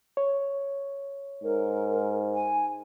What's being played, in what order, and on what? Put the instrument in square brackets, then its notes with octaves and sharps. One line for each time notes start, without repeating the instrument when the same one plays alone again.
[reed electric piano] C#5
[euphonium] G#2 [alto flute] A#4
[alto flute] G#5